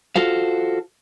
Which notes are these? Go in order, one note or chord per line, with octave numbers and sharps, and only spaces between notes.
F4 F#4 A4 C5 F5